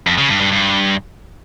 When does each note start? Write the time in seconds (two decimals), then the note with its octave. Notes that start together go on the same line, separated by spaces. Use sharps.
0.07 F2
0.18 C#3
0.29 G2
0.41 G2
0.52 G2